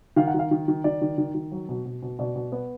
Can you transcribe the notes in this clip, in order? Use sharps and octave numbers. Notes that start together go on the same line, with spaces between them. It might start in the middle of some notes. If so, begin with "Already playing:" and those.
D#3 F5
F#5
D#3 F5
D#3
D#3
D#3 D5
D#3
D#3
D#3
F#3
B2
B2
B2
B2 D5
B2
B3